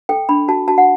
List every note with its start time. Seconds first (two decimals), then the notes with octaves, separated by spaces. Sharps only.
0.09 A4 G5
0.29 D4 B5
0.48 F#4 A5
0.68 F#4 A5
0.78 F#5